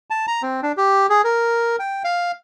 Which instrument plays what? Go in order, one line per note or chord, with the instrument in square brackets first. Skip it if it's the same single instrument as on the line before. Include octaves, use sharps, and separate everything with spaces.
[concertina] A5
A#5
C4
D4
G4
G#4
A#4
G5
F5